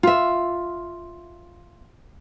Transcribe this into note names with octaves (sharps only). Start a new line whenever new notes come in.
F4 E5